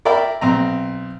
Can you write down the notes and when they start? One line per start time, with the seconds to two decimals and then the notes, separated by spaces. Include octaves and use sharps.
0.05 A#4 D5 E5 G5 B5
0.41 B1 C4 A#5